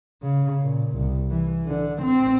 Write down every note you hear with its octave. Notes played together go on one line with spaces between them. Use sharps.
C#3
A#2
C2
E3
D3
C4